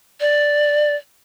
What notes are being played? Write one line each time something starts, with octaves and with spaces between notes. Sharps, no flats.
D5